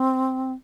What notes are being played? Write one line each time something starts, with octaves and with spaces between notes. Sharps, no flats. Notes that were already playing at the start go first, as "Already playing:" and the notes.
Already playing: C4